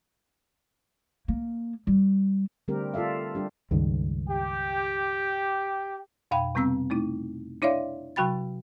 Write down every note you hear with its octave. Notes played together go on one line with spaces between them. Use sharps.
A#3
G3
D3 G3 A3 C4 G4 A#4
F4 A4 D5 E5 F5
G3 D4 G4
C#2 G2 D#3
G4
F2 B2 F5 G5 B5
C3 G3 B3 C4 A#5 E6
A3 D#4 E4
D4 E4 C#5 D5 E5 F5
C3 F#3 F#4 G5 B5 A6